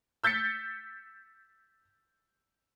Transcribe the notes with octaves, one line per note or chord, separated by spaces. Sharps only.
E6 G6 A6 B6 C#7